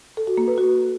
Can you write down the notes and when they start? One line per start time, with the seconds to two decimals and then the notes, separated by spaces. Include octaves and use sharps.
0.17 A4
0.27 F#4
0.37 A#3
0.48 B4
0.58 F#4